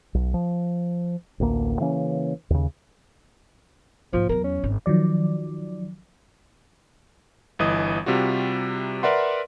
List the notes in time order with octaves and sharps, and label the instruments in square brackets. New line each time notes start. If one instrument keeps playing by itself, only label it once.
[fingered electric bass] B1
F3
A1 D2 A#3
C#3 E3 A#3 C#4
D#2 C#3
[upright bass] G#2 A#3 [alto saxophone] F3
[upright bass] E2 F#3 [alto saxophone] A#4
[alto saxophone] C#4
[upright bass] G#1
[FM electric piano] D#3 F3 F#3 D5
[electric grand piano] G1 E3 D#5 D#6
C3 G3 F4 F#4
A#4 B4 D5 E5 F#5 C6